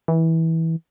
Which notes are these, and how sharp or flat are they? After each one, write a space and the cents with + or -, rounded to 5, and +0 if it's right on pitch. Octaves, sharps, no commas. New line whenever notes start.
E3 -20